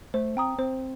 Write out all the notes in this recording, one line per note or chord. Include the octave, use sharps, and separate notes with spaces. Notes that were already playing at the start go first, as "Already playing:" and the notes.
A3 C5
C4 G5 A#5 D#6
C4 C5